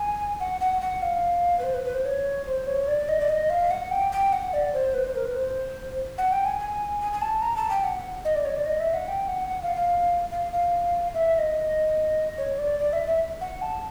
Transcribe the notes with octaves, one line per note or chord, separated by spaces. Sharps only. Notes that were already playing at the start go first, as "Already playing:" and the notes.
Already playing: G#5
F#5
F#5
F#5
F5
B4
C5
B4
B4
C5
C#5
C5
C#5
D5
D#5
D5
D#5
F5
F#5
G5
G5
F#5
D5
C5
B4
C5
A#4
B4
C5
F#5
G5
G#5
G#5
G#5
G#5
A5
A#5
A5
G5
F#5
D#5
D5
C#5
D5
D#5
E5
F#5
G5
F#5
F#5
F5
F5
F5
F5
E5
E5
D#5
C#5
D5
D5
E5
E5
F#5
A5